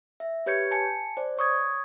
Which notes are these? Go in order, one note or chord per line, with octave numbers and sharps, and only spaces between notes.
E5
G4 B4 C#5 G6 G#6 C#7
G#5 A5 C#7
C5 D5
C#5 C#6 D#6 G#6